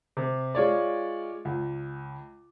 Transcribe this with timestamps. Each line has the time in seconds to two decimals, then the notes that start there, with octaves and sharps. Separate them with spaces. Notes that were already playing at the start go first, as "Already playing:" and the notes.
0.17 C3
0.55 G#3 F4 C#5 D5
1.45 C#2